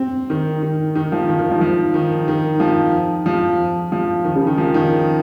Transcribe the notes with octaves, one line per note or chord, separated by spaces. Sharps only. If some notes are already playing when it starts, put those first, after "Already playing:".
Already playing: C4
D#3
D#3
D#3
F3
D#3
D#3
F3
F3
D#3
D#3
F3
F3
F3
D#3
C#3
D#3
F3
D#3